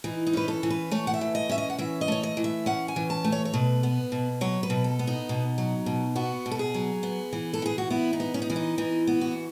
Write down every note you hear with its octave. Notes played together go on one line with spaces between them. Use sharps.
E3 D#4
D#4
C#4 B4
A4
E3
B4
A3 C#5
F#5
E5
E3
D#5
C#4 E5
D#5
F#5
E3 E5
D#5
A3 C#5
D#5
E3
E5
C#4 F#5
G#5
E3
A5
A3
C#5
C#5
B2 B4
B3
B2
F#3 C#5
B4
B2
A4
B3
D#4
B2
F#3
B2
B3 F#4
B2
A4
G#4
F#3
B3
E3
A4
E3 G#4
F#4
B3 E4
D#4
B3
C#4
D#4
E3 C#4
D#4
E3 D#4
B3
F#4